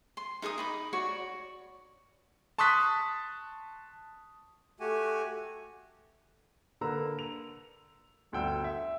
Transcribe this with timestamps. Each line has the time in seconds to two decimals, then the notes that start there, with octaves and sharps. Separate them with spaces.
0.17 C6
0.42 D#4 G#4 A#4 D#6
0.58 D#4 B5 D6
0.93 F#4 C#5 D5 C#6
2.58 A5 C6 C#6 D#6 F#6 B6
4.80 A3 F#4 G4 G#5
6.81 D3 A#3 B4 A#5 E6
7.19 F7
8.32 G1 D2 F#5 G5 E6
8.64 E5